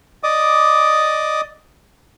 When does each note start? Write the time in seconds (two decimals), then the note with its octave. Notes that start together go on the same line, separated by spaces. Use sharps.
0.23 D5 D#5 D6 D#6